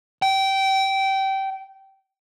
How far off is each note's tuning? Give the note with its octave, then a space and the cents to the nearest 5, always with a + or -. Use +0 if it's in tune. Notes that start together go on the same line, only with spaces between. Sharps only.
G5 -20